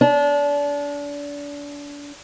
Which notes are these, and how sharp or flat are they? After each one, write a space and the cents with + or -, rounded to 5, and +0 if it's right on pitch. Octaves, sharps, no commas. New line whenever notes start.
D4 -30